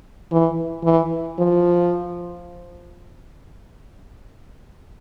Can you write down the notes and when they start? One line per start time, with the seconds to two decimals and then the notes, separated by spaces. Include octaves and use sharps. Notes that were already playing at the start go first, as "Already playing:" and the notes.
0.32 E3
0.84 E3
1.39 F3